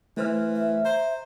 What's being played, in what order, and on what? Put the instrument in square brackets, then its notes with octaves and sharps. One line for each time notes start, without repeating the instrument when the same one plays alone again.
[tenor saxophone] E3 [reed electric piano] A3 C5 F6
[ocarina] E5
[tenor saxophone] C5 [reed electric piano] A#5